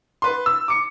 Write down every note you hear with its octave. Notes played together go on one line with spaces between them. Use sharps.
B4 C6
E6
D6 C#7